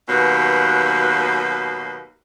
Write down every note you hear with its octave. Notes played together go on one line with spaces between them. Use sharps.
D#2 B2 F#3 B4